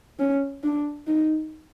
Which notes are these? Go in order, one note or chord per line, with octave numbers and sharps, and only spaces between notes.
C#4
D4
D#4